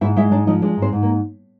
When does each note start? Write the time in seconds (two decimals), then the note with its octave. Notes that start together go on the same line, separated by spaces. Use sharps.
0.01 G#2 E4 E5
0.16 G#3 E4 E5
0.32 G#2 D4 D5
0.47 F3 D#4 D#5
0.62 G#3 D4 D5
0.77 G#2
0.82 C4 C5
0.92 G#2
1.02 A#3